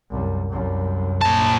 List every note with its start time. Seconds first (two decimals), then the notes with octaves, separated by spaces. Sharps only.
0.11 C2 F#2
0.50 C2 F#2
1.21 A#2 A5